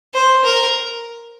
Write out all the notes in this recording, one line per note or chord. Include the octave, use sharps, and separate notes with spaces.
C5
A#4